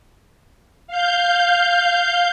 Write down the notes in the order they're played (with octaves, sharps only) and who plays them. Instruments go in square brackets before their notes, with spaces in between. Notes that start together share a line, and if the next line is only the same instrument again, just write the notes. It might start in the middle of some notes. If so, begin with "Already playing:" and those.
[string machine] F5 G6